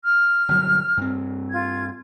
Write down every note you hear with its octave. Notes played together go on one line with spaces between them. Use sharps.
F6
G1 B2 F#3
G2 C4
F4 G#6